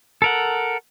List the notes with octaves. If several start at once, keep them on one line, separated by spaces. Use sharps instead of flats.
A4 A#4 F#5